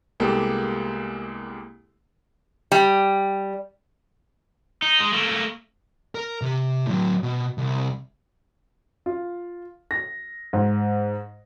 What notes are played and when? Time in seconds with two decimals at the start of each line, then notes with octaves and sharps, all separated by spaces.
0.20 C2 G#3 A#3 B3 G4 A4
2.72 G3
4.82 D#4
5.00 G#3
5.13 A3 A#3
6.15 A#4
6.42 C3 G4
6.87 A2 F#3
7.23 B2
7.58 C2
9.06 F4
9.91 A#6
10.53 G#2